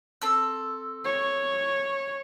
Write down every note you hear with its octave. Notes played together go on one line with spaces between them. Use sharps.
C4 A4 E6
C#5